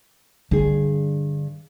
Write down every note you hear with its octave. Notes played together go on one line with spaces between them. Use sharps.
G2 D3 G#4